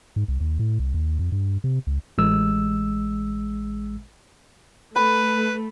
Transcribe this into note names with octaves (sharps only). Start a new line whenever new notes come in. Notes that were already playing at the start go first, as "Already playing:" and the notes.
G#2
C2
D#2
A2
C2
D#2
F2
G2
C3
C#2
A1 G#3 E6
A3 B4 B5